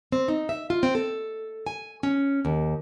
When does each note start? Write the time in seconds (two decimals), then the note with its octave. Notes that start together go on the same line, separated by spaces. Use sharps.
0.12 C4
0.28 D#4
0.49 E5
0.70 F4
0.83 C4
0.95 A4
1.67 G#5
2.03 C#4
2.45 D#2